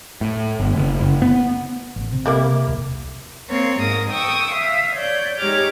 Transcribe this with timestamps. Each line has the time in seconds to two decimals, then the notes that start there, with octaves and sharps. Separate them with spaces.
0.21 A2
0.60 G1
0.76 F#1
1.00 F#1
1.22 B3
1.96 A1
2.12 C3
2.26 G3 A#3 E4
2.67 D#1 C2
3.48 A#3 C4 C#5
3.80 G#2 A#4 D#6 A#6
4.11 G5 C#6 D#6 E6
4.52 E5 F5
4.95 C#5 D5 G6
5.40 G#3 D#4 G4 C#5 D6 F6